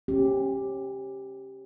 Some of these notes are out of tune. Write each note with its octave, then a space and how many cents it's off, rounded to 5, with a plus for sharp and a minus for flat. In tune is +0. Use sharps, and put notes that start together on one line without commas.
C#4 -35 G4 +0